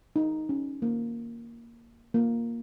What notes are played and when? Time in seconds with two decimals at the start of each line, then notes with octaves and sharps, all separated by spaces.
0.16 D#4
0.49 C#4
0.82 A#3
2.14 A#3